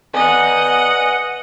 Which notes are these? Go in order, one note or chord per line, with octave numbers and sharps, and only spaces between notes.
B4 D5 D#5 F#5 G#5